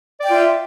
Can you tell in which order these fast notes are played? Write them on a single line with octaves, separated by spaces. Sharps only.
D5 G5 F4 E5